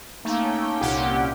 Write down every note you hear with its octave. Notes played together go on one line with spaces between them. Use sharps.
A3 A#3 C#4 D#4 G5
C2 A#2 G4 F#5